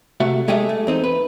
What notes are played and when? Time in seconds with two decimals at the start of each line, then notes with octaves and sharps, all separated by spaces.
0.20 C3 A3 F#4 E5
0.48 B1 G#3 A3 G4 D#5 E5
0.69 A3
0.87 E2 C4 D#4
1.04 B4